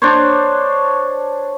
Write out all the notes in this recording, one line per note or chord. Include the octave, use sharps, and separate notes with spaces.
D4 C5 C#5